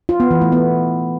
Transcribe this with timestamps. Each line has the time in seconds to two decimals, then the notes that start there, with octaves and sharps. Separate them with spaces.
0.09 F4
0.20 B3
0.31 E3
0.42 A3
0.52 B3